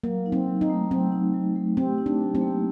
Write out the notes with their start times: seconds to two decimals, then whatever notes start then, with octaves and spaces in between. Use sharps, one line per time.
0.04 F#3 A#3
0.26 D#4
0.32 C4
0.48 F#3
0.61 D#4
0.70 A3
0.91 F#3 C4
1.12 D#4
1.34 F#3
1.56 A3
1.77 C4 G4
1.98 D#4
2.06 D4
2.21 F#3
2.35 C4
2.41 A#3